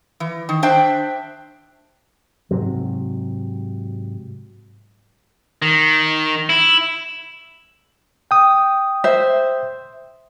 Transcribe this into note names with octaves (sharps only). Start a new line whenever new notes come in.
E3
D#3
D4 C5 E5 G5
G#2 C3 F#3
D#3
E4
G5 D#6
C5 E5